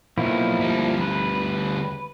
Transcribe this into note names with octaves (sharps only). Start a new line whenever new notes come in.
B1 F3 A#3 E4
D2 G3
B4